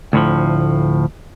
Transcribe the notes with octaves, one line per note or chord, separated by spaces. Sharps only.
D2 A2 F3